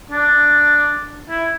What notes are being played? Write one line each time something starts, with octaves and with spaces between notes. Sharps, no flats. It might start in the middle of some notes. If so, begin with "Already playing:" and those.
D4
E4